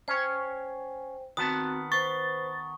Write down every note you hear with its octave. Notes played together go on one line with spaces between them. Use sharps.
C#4 C5 C#5 G5
D#3 B3 C4 F#4 A5 D#6
B4 C5 C#6 A6